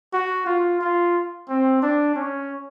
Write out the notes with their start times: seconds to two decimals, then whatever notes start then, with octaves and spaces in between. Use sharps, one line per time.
0.13 F#4
0.46 F4
0.81 F4
1.49 C4
1.82 D4
2.16 C#4